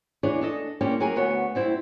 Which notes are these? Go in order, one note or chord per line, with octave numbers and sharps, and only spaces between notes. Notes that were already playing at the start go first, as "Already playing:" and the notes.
E2 E3 D4 G#4 C#5 D5
D4 A4 D#5
G#3 A#3 C#4 D4 E4 G4
F#3 G#4 A#4 G#5
D2 B3 F#4 C#5
G3 C4 E4